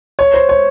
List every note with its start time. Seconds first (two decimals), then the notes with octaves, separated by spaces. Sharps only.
0.19 C#5
0.34 C5
0.49 C#5